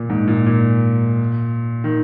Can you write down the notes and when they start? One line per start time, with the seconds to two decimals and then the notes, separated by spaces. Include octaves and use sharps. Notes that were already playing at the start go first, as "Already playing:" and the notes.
Already playing: A#2
0.10 G#2
0.28 A#2
0.46 A#2
1.84 D#3